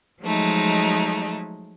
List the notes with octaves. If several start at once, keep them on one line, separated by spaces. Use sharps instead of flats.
F3 F#3 G#3 A3 D#4